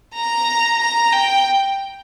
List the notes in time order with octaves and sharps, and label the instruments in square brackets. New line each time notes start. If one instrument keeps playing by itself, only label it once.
[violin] A#5
A#5
G5